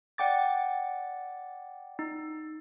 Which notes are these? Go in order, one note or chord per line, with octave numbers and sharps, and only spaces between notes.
D5 F#5 G5 D6 A6
D#4